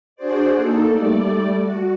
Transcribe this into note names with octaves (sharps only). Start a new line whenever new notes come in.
D4 F#4 G#4 C5 D5
A#3 D#4 A4
G3 A3 D5
F#4